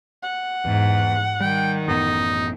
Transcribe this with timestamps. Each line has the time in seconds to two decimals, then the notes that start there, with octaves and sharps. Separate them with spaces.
0.23 F#5
0.65 E2 G#2
1.40 D#3 G3 G5
1.88 A1 F#2 B3 D#4